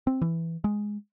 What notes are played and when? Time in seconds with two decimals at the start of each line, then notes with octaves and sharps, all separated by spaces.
0.07 C4
0.22 E3
0.64 G#3